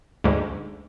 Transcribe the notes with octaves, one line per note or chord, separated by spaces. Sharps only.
D2 G#2